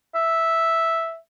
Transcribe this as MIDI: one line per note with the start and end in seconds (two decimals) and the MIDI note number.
0.15 1.16 76